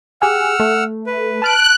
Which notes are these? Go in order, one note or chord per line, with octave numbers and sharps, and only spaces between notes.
G4 G#4 F#5 E6 F6
A3
B4
A5 F6 F#6 D7